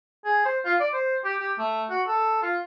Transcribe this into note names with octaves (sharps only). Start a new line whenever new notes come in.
G#4
C5
F4
D5
C5
G4
G4
A3
F#4
A4
F4